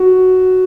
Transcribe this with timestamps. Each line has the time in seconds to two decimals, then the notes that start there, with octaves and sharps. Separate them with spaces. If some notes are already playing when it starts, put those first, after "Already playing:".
Already playing: F#4